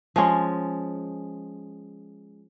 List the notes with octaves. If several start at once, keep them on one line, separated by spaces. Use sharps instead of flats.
F3 G#3 C#4